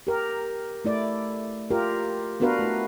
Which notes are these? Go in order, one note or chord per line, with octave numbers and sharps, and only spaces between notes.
G4 A#4
A3 E4 D5
F4 G4 A#4
B3 D4 F#4 A#4 B4 F5
A3 E4